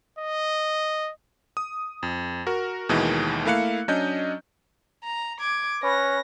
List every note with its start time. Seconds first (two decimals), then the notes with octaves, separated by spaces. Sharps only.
0.19 D#5
1.57 D#6
2.03 F2
2.47 F#4 A#4
2.89 D#2 B2 D#3 E3 G#3
3.45 A3 A#3 E4 F5 F#6 C#7
3.88 F#3 C#4 D4 D#5 G6
5.04 A#5
5.41 D6 G#6
5.83 C#4 B4 A#6